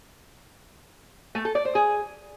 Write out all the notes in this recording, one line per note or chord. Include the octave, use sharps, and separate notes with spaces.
A3
A4
D5
C5
G#4